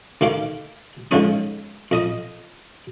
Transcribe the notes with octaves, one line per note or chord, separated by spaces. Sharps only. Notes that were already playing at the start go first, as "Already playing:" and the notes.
D2 D#3 F5 D6
G#2 D3 F3 G#3 C#4 D#6
F2 D#5 D#6